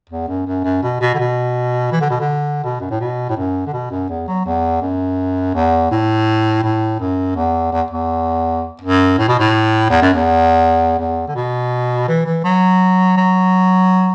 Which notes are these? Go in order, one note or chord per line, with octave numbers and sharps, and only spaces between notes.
E2
F#2
F#2
F#2
B2
B2
D3
B2
E3
D3
B2
D3
B2
F#2
A2
B2
A2
F#2
D3
B2
F#2
E2
F#3
E2
F#2
E2
A2
A2
F#2
E2
E2
E2
F#2
A2
B2
A2
E2
F#2
E2
E2
D3
B2
E3
E3
F#3
F#3